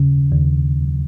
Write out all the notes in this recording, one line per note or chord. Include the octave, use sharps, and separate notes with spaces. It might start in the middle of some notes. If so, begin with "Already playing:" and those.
Already playing: D#2 C#3
D#2